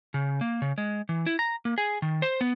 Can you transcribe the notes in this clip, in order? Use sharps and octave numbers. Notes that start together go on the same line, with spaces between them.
C#3
A#3
C#3
G#3
E3
E4
A#5
A#3
G#4
D#3
C5
B3